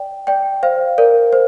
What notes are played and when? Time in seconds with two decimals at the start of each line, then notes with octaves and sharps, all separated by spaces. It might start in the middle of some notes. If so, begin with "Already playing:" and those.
Already playing: D5 G5
0.27 D5 G5
0.63 C5 F5
0.98 A#4 D5
1.33 C5